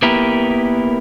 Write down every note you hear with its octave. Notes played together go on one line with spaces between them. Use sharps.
A#3 B3 E4 G4 A#4 B4